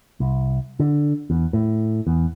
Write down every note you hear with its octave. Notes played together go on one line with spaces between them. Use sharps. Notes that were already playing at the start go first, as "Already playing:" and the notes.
C2
D3
E2
A2
E2